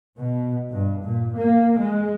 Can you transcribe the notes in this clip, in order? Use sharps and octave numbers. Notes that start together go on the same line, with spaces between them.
B2
G2
A#2
A#3
G#3